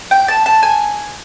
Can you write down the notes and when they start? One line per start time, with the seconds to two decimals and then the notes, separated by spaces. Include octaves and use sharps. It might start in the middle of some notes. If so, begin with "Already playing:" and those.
0.11 G5
0.28 A5
0.46 A5
0.63 G#5